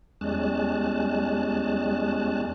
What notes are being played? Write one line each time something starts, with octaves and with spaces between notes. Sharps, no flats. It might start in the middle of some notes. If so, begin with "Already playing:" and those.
E2 G3 G#3 C#4 A5 F#6